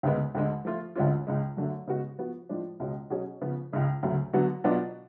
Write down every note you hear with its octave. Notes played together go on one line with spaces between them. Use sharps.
D2 C#3 G#3 B3
D2 D3 G#3
F3 A3 F4
D2 D3 G#3 C#4 F4
C#2 C#3 G#3
F#2 D3 F#3 A3
C#3 G#3 B3 F#4
F3 B3 F#4
A2 F3 G#3 D4
C#2 B2 G#3 C#4
B2 F#3 C#4 G#4
C#3 F3 B3
C#2 C#3 G#3
D2 C#3 F#3 A3
D3 F#3 B3 F#4
B2 F#3 B3 D4 F4